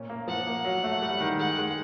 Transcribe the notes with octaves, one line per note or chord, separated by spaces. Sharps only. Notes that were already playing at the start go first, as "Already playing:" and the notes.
Already playing: A#2 C#4
A#3
F3 F#5
A#3
F#3
A3
G3
D#3
G#3 F#5
G#3